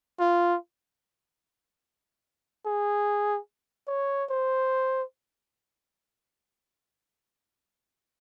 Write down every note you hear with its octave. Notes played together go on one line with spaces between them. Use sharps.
F4
G#4
C#5
C5